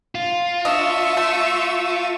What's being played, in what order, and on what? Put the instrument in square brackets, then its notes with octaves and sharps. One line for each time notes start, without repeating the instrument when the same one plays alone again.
[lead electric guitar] F4
[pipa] D4 D#5 [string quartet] E5 C#6 E6
[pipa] A3